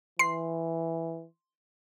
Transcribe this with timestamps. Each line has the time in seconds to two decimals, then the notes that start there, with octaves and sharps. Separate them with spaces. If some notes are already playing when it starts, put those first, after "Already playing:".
0.19 E3 C6 C7